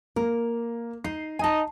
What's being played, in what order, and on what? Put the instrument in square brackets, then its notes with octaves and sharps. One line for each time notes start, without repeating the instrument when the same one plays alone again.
[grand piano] A#3 [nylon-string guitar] A#4
[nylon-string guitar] D#4 [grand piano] C7
[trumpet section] D#4 D#5 [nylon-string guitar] G#5 A5